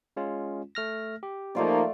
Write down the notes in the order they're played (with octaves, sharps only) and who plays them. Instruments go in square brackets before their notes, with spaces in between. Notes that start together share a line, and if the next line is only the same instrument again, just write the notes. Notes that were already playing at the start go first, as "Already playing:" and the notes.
[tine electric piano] G#3 C#4 F4
A3 F6 A#6
G4
[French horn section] F3 A#3 D#4 [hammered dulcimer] A3 F4 D5